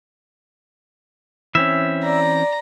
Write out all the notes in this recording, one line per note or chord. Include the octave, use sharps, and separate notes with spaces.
E3 C4 C#4 E5
D5 A#5